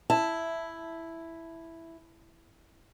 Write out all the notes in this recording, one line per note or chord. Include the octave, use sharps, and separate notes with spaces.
E4 A5